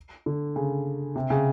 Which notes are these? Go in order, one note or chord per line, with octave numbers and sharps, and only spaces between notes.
D3
C#3
C3
C#3